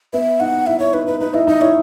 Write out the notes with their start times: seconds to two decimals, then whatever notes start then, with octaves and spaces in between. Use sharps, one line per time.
0.13 B3 E5
0.40 D#4 F#5
0.67 E4 E5
0.80 E4 C#5
0.94 D#4 B4
1.07 D#4 B4
1.21 D#4 B4
1.34 E4 D#5
1.47 D#4 D#5
1.61 E4 C#5